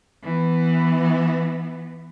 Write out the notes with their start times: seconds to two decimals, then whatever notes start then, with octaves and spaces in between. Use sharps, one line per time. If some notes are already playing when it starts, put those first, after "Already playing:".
0.23 E3 B3